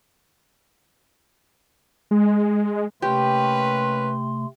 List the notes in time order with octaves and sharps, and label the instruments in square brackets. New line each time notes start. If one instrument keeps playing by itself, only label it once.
[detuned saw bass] G#3
[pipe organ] C3 A3 [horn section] A#3 C#4 B4 [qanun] G4 [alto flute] C6